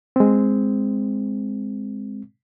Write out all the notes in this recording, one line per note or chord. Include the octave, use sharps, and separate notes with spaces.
G#3 C4